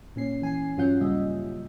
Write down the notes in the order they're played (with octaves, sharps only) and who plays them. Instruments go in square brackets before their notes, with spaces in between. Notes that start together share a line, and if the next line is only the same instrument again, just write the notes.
[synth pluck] A#2 C#4 C7
E3 G#5 C7
G2 F#3 C#4 F4 F#5 G6
A#2 C#3 G3 D#5 E5